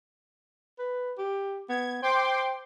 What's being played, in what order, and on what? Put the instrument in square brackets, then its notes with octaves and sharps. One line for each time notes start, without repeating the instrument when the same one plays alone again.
[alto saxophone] B4
G4
[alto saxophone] B3 [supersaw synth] G#6
[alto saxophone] C5 [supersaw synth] G5 C6 D6